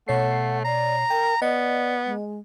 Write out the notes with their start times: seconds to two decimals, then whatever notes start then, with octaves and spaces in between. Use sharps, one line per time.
0.08 B2 A3 C#5 F#5 C7
0.64 D5 A#5
1.10 A#4 G5
1.42 B3 D5 D#5
2.06 G#3